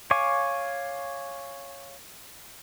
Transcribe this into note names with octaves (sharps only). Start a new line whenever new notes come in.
C#5 F5 G#5 C#6 D6